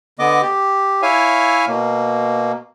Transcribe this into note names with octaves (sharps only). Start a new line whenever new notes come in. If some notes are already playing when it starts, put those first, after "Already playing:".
D3 B3 D#5 D6
G4
E4 C#5 E5 F5 G#5
B2 A#3